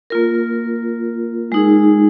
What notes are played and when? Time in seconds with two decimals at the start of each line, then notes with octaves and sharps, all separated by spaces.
0.10 A#3 F4 A#4
1.52 G#3 D#4 G#4